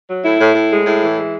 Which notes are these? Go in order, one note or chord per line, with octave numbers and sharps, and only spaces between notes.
F#3
A2 E4
A2
A2
G#3
A2 E4
E3
G#3